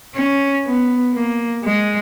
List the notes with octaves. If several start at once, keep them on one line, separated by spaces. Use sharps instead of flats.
C#4
B3
A#3
G#3